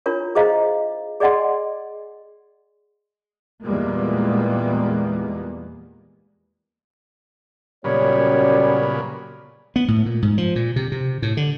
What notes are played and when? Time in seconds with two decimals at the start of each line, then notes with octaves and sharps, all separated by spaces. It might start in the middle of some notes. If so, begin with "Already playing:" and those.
0.06 D4 E4 F4 A#4 C#5
0.35 G#4 C5 D#5 F5 A#5
1.20 G#4 D5 D#5 F#5 G#5 C6
3.63 E2 A#2 G3 G#3 A#3 B3
7.84 F#2 A#2 C#3 G3 B3 C#5
9.76 B3
9.88 A2
10.06 A#2
10.22 G#2
10.38 F3
10.56 A#2
10.76 C3
10.92 C3
11.22 A2
11.37 D3